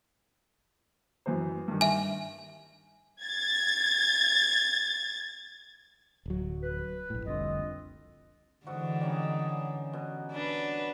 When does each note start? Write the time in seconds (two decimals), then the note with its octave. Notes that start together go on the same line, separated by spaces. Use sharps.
1.26 F#2 E3 C5
1.68 G2 D#3 G3
1.81 E5 G#5
3.22 G#6 A6
6.26 D1 F#3
6.63 B4
7.10 A#1 A2
7.26 F1 C2 D3 C4 F4 D#5
8.67 G#2 D3 E3 F#4
9.01 G3 C#4 D#4
9.93 B2
10.31 D4 B4